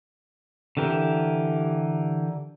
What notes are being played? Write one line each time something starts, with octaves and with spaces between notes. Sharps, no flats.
D3 E3 G4 A#4